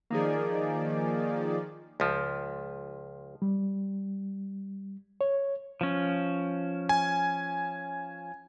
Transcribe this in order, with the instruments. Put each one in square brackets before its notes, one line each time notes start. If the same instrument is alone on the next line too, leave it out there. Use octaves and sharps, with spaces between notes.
[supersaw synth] D#3 F3 D5 [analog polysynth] A#3 D#4 G#4
[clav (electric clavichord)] C#2 F3
[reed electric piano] G3
C#5
[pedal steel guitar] F3 C#4
[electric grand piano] G#5